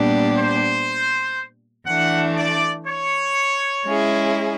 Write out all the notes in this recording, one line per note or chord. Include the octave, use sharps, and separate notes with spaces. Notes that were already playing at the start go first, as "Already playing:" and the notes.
Already playing: A#2 G3 B3 D4 G4
C5
E3 A3 D4 F#5
D5
C#5
G#3 C#4 E4 G#4